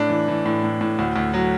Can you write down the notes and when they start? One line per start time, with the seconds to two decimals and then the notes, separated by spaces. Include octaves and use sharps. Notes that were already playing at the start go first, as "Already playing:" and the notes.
Already playing: A2 D4
0.10 E3
0.28 E3
0.46 A2
0.64 A2
0.81 A2
0.99 D2
1.16 D2
1.34 F#3